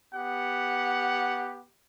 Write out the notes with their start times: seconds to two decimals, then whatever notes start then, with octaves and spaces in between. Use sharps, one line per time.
0.14 B3 G4 F#5